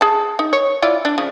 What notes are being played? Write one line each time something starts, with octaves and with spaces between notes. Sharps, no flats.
G#4 A5
D#4
C#5
E4 F4 D5
D4
C#3 F3